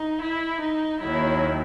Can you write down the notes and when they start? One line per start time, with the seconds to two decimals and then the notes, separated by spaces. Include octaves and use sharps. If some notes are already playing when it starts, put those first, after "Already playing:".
Already playing: D#4
0.23 E4
0.63 D#4
1.02 D#2 D#3 F#3 E4